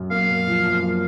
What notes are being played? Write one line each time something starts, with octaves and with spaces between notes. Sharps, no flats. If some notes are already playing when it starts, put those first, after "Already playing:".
Already playing: F#2
A#3 F5
F#2
F3
F#2
A#3